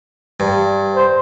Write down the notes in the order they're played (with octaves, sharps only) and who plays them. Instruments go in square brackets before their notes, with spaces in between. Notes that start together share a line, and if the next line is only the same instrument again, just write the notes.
[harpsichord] G2
[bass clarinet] C5